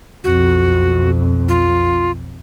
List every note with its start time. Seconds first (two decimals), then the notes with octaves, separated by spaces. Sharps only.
0.24 B1 F2 F#4
1.48 F4